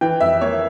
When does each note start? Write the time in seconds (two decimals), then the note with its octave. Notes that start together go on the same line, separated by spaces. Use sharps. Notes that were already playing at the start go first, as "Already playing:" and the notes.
0.01 E3 G5
0.20 F2 E5
0.41 A#3 C#5